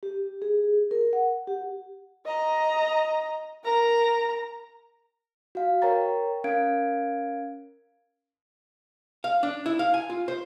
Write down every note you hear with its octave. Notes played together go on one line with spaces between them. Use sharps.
G4
G#4
A#4
F#5
G4
D#5 A#5
A#4 A#5
F#4 F5
A#4 C#5 G5 A#5 A6
C#4 A#4 F5 G#6 D7
F5
D4
E4
F5
G#5
F4
C5